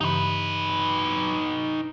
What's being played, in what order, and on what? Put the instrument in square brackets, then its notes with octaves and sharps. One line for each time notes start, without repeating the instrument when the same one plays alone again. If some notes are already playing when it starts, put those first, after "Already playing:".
[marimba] G2 C#3 E3 [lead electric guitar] D#4 B4